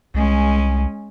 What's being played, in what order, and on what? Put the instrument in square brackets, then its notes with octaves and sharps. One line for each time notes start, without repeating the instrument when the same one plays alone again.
[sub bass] C2 [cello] G#3 C#4